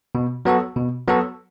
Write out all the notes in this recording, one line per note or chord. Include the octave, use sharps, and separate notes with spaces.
B2
F#3 B3 F#4 A4
B2
F#3 B3 F#4 A4